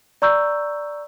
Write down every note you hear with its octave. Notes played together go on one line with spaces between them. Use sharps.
D5 A#5 C#6 E6 G6